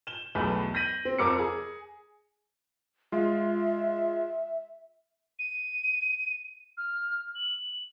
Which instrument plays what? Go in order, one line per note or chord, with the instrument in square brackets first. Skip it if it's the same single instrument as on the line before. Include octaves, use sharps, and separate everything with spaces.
[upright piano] E7 G7
B1 E2 A3 B4
G6 A#6 B6 D#7 F#7
C4
F2 A#4 D6 E6 C#7
G#4
[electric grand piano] G#3 F4 [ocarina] E5
[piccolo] D#7
F6
F#7